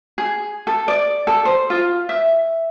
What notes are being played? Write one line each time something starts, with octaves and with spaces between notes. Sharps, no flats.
G#4
A4
D5
A4
C5
F4
E5